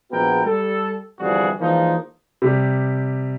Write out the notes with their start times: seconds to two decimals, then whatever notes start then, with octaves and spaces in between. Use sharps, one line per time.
0.12 A#1 B3 F#4 G#4 A#4 G5
0.44 G3 A4
1.19 G1 F2 E3 G3 F#4 G#4
1.59 E3 F3 G#3 A#3 D4 D#4
2.42 C3 G3